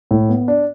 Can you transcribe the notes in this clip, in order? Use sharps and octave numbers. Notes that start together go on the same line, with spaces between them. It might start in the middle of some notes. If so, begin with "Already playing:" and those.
A2
B3
D4